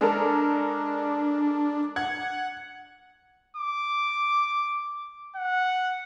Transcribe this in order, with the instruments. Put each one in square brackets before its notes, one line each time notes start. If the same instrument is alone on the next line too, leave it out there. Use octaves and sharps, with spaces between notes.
[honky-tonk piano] G#3 A4 A#4 [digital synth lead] D4
[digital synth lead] F#5 [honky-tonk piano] G#6
[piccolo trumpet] D6
F#5